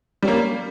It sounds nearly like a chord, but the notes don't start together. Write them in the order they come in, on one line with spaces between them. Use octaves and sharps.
G3 C#4 A#3